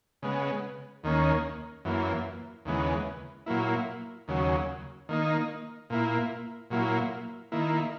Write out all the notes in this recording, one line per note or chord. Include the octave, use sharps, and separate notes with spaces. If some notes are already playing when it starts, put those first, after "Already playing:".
C#3 G#3 B3
D#2 D#3 A#3 C#4
F#2 E3 A#3
D#2 C#3 E3 G#3 B3
A#2 F#3 A#3 E4
D#2 C#3 F#3
D#3 A#3 D#4
A#2 A#3 E4
A#2 F#3 A#3 E4
D#3 A#3 E4